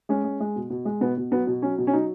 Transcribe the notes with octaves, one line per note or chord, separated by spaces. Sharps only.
G#3 C#4
G#3
G#3
B2
B2
G#3
B2 B3
B2
F#3 B3
B2
F#3 C#4
B2
C#4
F#3 D#4